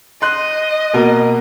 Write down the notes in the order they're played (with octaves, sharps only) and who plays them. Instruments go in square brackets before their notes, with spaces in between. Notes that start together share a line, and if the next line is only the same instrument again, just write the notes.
[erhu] D#5 [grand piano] C6 F#6
[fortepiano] B2 [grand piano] A#3 A#4